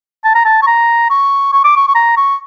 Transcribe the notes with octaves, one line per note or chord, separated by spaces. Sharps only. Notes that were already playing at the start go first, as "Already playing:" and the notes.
A5
A#5
A5
C#6
A#5
C#6
C#6
D6
C#6
C#6
A#5
C#6